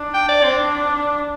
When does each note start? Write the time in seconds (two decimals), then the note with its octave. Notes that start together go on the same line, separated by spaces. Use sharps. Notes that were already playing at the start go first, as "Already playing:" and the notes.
Already playing: D4
0.14 G5
0.29 D5
0.43 C4 D4